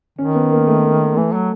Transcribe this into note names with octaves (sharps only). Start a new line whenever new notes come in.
D#3 C#4
B3
A#3
A3
E3 A3
F#3